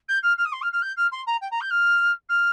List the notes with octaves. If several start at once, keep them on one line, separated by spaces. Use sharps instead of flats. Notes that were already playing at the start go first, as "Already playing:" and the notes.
G6
F6
F6
D#6
C6
F6
F6
G6
F6
C6
A#5
G5
A#5
G6
F6
F6